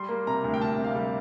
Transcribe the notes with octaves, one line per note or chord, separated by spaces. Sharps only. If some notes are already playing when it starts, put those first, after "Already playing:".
Already playing: G3 C6
A#3
C3 A#5
D2
G5
C3 A5
C3
F5
G3